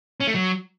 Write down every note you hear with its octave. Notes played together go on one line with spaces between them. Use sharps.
C#4
A3
F#3